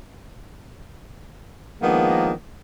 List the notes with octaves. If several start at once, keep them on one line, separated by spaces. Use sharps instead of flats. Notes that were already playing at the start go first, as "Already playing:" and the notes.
D#3 F3 G#3 A#3 B3 D4